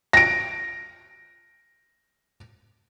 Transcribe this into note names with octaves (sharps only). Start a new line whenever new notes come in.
A#6 D7